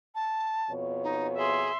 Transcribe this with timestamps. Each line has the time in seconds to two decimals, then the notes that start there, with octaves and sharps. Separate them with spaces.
0.15 A5
0.70 F2 B2 C#5
1.03 D#4
1.37 G#4 E5 C6